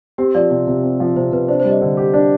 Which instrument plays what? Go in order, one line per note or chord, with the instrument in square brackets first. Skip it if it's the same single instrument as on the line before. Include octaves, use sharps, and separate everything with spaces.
[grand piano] C4 [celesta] G4
[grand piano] F3 [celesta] D5
[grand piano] C3 [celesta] D5
[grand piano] C3
C4
F3
[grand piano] C3 [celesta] C5
[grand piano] C3 [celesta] B4
[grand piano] D4 [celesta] C5
[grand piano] G3 [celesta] C5
[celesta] D#5
[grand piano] D3
G4
D4